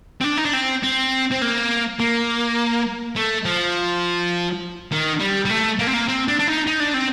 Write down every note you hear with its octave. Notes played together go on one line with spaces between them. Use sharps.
C4
D4
D#4
D4
C4
C4
C4
A#3
A#3
A3
F3
D#3
G3
G3
A3
A#3
C4
A#3
C4
D4
D4
D#4
D#4
D4
C4